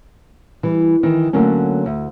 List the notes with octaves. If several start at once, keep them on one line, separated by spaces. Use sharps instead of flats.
E3 G3
D#3 E3
D3 F#3 A3 A#3 C#4
D2